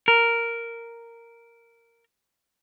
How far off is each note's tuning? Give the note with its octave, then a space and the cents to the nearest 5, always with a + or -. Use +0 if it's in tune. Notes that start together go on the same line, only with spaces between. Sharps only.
A#4 -5